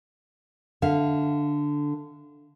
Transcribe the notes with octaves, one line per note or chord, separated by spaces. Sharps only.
D3 E5 F5